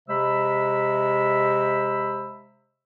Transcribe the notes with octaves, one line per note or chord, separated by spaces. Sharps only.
C3 G#3 C5 E5 B5 E6